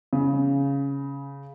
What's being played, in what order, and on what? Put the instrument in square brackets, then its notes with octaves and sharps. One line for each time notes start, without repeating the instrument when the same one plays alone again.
[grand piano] C#3